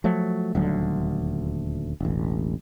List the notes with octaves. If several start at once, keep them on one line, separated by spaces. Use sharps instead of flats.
F3 F#3 A3
D#1 D2 D3 F#3
E1 A1